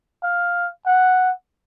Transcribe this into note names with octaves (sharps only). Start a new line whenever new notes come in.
F5
F#5